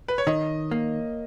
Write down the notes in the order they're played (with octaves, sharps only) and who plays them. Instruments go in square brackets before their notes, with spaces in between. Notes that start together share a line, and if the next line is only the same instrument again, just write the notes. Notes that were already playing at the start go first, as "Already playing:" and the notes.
[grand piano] B4
C#5
[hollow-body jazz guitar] D#3 [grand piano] D#5
[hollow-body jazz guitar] A#3